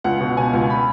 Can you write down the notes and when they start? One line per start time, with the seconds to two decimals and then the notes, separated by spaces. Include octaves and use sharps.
0.04 C#2 F#5
0.20 B2
0.37 B2 G#5
0.53 C#2
0.70 B5